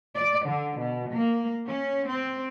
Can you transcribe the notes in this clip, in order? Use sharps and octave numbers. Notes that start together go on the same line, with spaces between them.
D5
D3
B2
A#3
C#4
C4